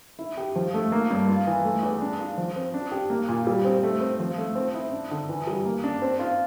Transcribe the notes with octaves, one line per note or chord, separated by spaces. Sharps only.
E4
G4
F3
A3
A#3
G2
F4
E3
A3
E2
D4
F4
F3
C4
D4
G4
A#3
A#2
G3
C4
A3
C4
F3
A3
C4
E4
D4
D3
E3
G3
A#3
D4
C4
F4